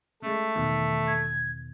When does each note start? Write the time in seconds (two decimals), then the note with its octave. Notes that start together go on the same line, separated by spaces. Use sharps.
0.22 C#3 G#3 A3
0.56 E2 B2 D#3
1.07 G#6